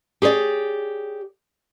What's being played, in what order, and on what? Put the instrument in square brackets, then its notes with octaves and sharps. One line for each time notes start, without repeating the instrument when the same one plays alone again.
[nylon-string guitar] G4 G#4 C#5 D5